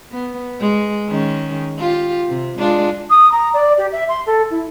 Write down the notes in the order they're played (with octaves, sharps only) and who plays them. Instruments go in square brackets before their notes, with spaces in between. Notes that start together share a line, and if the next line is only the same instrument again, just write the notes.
[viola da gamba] B3
G#3
D#3 G#3 C#4
F4 G4
C3
G#3 D4 F4
[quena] D#6
A#5
D5
G4
E5
C6
A4
E4